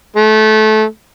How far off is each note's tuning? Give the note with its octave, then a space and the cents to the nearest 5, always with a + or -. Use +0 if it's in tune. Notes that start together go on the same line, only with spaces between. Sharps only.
A3 -20